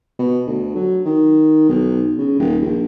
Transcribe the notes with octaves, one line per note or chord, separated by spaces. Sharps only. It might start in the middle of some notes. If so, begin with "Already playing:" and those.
B2
D2
F#3
D#3
B1
C#3
D#1
A#1